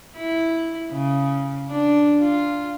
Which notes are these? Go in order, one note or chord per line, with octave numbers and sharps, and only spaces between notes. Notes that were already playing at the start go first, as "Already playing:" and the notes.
E4
C#3
D4
F4